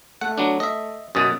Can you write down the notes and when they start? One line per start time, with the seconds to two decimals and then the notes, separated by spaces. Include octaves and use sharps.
0.21 A3 F#5
0.38 F#3 B3 D4
0.60 D#5 E5
1.15 F#2 B2 D#6 A6 D#7